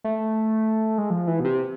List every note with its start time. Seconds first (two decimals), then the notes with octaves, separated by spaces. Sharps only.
0.04 A3
0.98 G#3
1.10 F3
1.27 E3
1.40 B2
1.45 C3